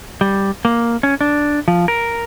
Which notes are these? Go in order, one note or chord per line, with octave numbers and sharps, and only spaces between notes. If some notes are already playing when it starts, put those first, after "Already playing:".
G3
A#3
C#4
D4
F3
A#4